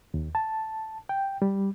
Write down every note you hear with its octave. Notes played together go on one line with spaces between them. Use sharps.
D#2
A5
G5
G3